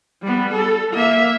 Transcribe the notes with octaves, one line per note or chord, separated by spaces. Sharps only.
G3 B3
A4
A#3 E5